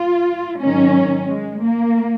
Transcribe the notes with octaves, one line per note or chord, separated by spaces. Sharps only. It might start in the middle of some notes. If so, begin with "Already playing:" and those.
Already playing: F4
G#2 D#3 F#3 C#4
G#3
A#3